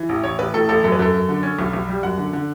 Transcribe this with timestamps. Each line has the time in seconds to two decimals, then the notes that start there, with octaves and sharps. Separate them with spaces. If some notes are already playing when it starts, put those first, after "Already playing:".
Already playing: E3
0.09 A1
0.24 A1 C#5
0.39 A1 B4
0.53 A2 A4
0.69 A1 A4
0.83 F#2 A4
0.92 B4
0.99 F#2 A4
1.13 F#2
1.29 D3
1.43 C#4
1.59 B1
1.73 B1
1.88 G3
2.03 F#2 F#5
2.18 D3
2.33 D3